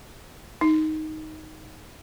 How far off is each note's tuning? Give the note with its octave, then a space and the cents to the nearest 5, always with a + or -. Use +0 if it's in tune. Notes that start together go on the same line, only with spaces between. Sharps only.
D#4 +5